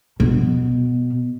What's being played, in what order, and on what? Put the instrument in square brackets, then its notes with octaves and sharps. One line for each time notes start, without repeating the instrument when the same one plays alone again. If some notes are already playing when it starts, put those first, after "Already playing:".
[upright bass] B2